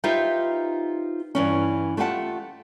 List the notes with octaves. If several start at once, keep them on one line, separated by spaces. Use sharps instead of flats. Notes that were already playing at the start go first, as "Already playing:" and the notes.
D#4 F4 G4 B4 C5 E5
G2 E3 C#4
A3 F4 G4 G#4 F#5 A5